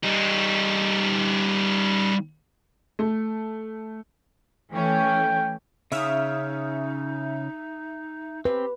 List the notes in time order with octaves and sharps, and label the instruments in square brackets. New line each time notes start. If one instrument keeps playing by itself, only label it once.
[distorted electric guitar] G3 D#4
[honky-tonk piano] A3
[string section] E3 A3 C#4 [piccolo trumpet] G5
[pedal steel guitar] C#3 C#4 F5 [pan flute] D#4 [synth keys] E5 D#6
[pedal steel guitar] C4 [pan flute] G4 [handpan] B4